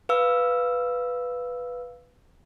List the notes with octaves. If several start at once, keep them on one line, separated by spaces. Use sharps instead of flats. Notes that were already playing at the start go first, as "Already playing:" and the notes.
B4 F5 E6